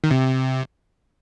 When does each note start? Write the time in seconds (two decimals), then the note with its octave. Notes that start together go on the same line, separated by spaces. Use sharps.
0.04 D#3
0.11 C3